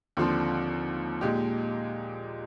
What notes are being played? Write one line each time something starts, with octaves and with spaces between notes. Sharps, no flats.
D#2 D3 F3 C4
A#2 G#3 D#4 G4